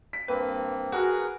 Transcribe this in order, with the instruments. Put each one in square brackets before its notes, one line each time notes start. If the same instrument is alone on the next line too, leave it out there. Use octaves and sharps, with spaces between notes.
[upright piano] B6
[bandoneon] G2 A#3 C4 [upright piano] B4
[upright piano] F#4 [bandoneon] G#4 A#4 B4